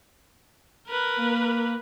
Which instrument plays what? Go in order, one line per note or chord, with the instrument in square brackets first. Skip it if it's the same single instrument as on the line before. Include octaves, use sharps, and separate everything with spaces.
[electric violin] A#4 B4
[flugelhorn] A#3